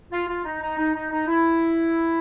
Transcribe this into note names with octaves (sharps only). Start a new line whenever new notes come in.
F4
F4
D#4
D#4
D#4
D#4
D#4
E4